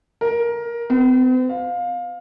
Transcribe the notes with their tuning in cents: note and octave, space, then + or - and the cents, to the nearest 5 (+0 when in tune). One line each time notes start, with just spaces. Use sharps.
A#4 +15
C4 -45
F5 +20